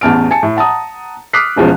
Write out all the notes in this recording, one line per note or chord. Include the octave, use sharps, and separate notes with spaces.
A1 E2 A5 F6 D7
G#5 A5 C#7
A2
F#5 A5 A#5 D#6
D6 D#6 F6 F#6 B6 C7
E1 E2 B2 F3 G#3 C#4